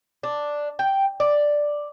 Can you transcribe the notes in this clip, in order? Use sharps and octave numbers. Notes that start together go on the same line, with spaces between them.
D4
G5
D5